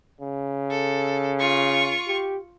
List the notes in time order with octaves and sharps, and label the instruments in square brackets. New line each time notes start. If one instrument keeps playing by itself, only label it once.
[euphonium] C#3
[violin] A4
F4 C#6
[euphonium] G4